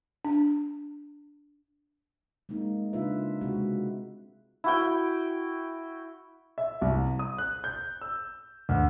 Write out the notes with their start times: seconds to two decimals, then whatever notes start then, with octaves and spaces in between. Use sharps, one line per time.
0.25 D4
2.49 G#3 A#3 C4 D#4
2.93 C#3 D4 D#4 F4 B4 E5
3.41 C3 G#3 C4 F#4
4.64 E4 F#4 G5
6.58 E5
6.81 C2
7.19 D#6
7.38 F#6
7.64 G6
8.01 E6
8.69 D2